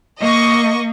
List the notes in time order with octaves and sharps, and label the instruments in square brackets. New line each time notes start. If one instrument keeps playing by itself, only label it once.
[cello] A#3 [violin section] D#5 C#6